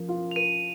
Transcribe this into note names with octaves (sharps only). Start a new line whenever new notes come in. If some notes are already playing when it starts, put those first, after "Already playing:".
Already playing: F3 A#4
F4
F7
A#4 D#7